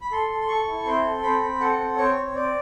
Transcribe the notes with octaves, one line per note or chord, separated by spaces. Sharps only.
B5
A4 C6
A4
C6
A4 C#6
E4
C4 C6
A4
C4 B5
C4
A4 F#5
C4
C4 C#5
C4
C4 D5